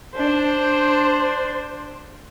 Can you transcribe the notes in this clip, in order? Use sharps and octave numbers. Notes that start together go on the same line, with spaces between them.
D4 C5